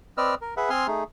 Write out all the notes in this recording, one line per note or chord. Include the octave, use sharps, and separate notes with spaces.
C4 B4 D5 D#5 E6 F6
A#4
G#4 B4 E5 F#5
C4 G#5 C6 D#6 F6
A3 D#4 G#4